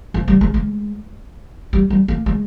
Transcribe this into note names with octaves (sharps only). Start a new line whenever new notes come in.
F3
G3
G#3
G#3
G3
G3
A#3
G#3